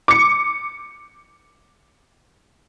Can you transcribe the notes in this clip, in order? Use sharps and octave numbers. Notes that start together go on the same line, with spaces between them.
D6 C#7